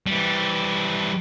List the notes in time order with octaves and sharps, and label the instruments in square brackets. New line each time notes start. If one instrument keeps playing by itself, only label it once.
[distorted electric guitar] E3 G3